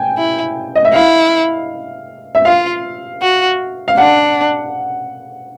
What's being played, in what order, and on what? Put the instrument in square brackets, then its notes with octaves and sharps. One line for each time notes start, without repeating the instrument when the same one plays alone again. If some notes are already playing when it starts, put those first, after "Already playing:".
Already playing: [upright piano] G5 G#5
[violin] E4
[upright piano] D#5
E5
[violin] E4 [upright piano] F5
[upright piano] E5
[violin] F4 [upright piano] F5
[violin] F#4
[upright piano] F5
[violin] D4 [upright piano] F#5